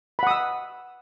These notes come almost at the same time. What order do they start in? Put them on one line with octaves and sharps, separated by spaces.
B5 F#5 D#6 E6